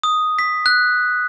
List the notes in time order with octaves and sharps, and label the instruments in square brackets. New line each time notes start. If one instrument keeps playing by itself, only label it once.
[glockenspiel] D#6
B6
F#6